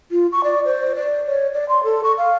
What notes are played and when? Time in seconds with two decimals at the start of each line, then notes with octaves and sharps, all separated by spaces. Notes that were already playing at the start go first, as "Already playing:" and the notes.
0.11 F4
0.32 C#6
0.44 D5
0.65 C5
0.95 D5
1.26 C#5
1.54 D5
1.69 C6
1.84 A4
2.04 C#6
2.18 F5